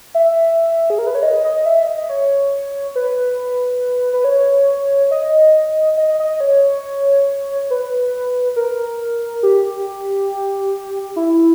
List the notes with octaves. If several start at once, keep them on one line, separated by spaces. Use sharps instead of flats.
E5
G#4
A#4
B4
C#5
D#5
D#5
E5
D#5
C#5
B4
B4
C#5
D#5
D#5
D#5
C#5
B4
A#4
G4
E4